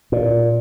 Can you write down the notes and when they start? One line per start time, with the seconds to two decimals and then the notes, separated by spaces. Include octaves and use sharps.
0.12 A#2